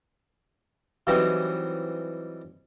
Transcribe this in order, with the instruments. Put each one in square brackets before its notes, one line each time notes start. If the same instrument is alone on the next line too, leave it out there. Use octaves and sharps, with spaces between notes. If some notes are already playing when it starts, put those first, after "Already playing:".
[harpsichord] E3 F#3 G3 C4 D#4